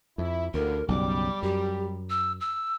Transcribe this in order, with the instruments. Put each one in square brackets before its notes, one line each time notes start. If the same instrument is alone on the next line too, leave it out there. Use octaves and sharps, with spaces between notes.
[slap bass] F2 [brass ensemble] E4
[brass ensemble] A1 G2 D3 [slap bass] D2 [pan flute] A#4
[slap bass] B1 F#2 C#3 [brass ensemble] G3 [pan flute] D6
[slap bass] F#2 [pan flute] G4
[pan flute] E6
E6